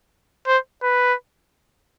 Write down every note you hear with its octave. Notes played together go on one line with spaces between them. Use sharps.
C5
B4